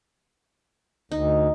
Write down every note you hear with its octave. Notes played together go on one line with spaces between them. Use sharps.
D2 D#4